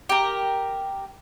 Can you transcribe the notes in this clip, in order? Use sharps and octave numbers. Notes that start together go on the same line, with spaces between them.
G4 A#4